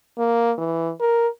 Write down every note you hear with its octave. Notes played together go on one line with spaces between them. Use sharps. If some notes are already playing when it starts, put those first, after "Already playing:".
A#3
E3
A#4